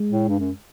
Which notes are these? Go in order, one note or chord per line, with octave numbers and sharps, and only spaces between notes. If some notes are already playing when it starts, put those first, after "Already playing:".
Already playing: G#3
A2
G2
F#2